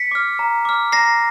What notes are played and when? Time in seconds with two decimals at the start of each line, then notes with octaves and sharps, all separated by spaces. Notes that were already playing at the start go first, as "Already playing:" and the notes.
Already playing: B6 C#7
0.11 D6 F6
0.39 A#5
0.65 D6 F6
0.92 A#5 A#6 C7